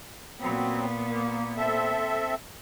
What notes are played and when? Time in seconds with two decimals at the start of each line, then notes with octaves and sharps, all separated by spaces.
0.40 A#2 F#3 B3 C4
1.08 A#3
1.57 C4 A4 E5